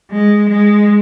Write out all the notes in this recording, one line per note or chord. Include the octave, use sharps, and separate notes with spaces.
G#3
G#3